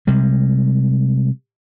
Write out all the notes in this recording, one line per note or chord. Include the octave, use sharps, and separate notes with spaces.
C3 G3 G#3